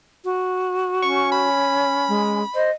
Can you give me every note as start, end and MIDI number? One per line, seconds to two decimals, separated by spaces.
0.25 1.48 66
1.02 2.40 61
1.02 1.31 85
1.32 2.61 83
2.08 2.42 56
2.55 2.70 72
2.55 2.70 75